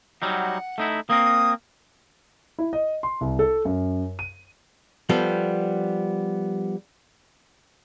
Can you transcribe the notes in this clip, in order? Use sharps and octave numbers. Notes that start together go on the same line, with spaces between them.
F#3 G3 D#4 F#5
A3 D#4 E4
A#3 C4 A#4 D#6
E4
D#5
C6
C2
A4
F#2
D#7
F3 G3 B3 A4